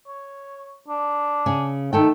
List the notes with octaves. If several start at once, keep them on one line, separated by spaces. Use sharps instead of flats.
C#5
D4
C#3 G#4
D#3 A3 A4 G5